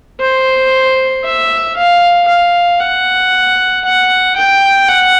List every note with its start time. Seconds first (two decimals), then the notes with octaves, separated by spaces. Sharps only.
0.21 C5
1.25 E5
1.76 F5
2.28 F5
2.80 F#5
3.84 F#5
4.36 G5
4.89 F#5